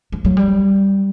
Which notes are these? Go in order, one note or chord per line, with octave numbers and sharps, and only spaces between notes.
F3
F#3
G3